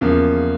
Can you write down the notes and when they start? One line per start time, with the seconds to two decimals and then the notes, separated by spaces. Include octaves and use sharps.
0.01 E2 C#3 F3 A#3